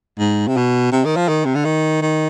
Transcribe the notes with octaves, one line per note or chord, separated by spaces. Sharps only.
G#2
C3
B2
C3
D#3
F3
D#3
C3
D3
D#3
D#3